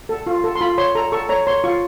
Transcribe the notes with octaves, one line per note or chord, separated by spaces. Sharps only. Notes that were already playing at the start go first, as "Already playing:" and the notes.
A4
F4
A4
C6
F4 B5
C#5 C6
A4 A#5
A4 C#6
C#5 A#5
C#5 C6
F4 C#6